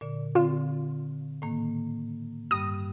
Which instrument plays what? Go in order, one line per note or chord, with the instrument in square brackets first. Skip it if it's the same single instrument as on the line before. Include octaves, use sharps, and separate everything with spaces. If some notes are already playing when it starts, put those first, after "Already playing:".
[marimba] A#2 D3 D5
[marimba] D3 C4 [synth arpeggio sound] F4
[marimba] A2 D#3 A#3
[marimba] G2 G3 [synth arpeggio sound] D#6